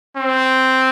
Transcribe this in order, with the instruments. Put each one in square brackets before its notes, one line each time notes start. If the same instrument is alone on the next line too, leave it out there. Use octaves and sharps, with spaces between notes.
[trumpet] C4